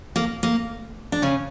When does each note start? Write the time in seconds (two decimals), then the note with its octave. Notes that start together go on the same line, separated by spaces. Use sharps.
0.16 A#3
0.43 A#3
1.12 D4
1.22 C#3 C#4